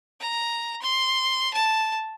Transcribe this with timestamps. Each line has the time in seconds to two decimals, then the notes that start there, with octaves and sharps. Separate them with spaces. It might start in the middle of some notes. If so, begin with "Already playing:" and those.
0.21 A#5
0.82 C6
1.54 A5